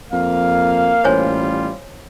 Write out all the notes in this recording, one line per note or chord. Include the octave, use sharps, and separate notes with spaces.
F2 A#3 F5
A1 G3 F4 C5 C#5 G#5